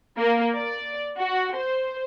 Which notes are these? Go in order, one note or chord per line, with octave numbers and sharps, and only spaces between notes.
A#3
D5
F#4
C5